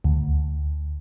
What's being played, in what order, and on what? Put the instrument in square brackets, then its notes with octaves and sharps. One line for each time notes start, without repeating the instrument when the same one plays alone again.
[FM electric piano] D2